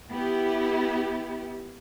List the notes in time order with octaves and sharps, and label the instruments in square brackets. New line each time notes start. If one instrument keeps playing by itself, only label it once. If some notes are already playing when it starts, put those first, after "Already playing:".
[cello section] B3 E4 G4